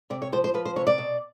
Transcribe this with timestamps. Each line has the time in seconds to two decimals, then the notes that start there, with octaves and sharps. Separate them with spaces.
0.10 C3 D5
0.22 C#5
0.32 F3 C5
0.44 C5
0.54 F3 B4
0.65 C5
0.76 C3 C#5
0.87 D5
0.98 B2